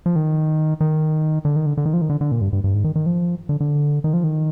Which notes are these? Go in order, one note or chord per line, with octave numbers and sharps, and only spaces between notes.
F3
D#3
D#3
D3
D#3
D3
D3
D#3
F3
D#3
D3
D3
A#2
G2
G2
G2
G#2
D#3
D#3
F3
D3
D3
D#3
F3
D#3